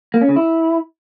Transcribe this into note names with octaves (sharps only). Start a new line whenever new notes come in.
A#3
C#4
C#3
E4